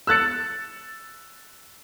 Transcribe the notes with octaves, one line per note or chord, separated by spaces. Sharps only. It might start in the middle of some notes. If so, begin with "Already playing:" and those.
E6 F#6 A6 C#7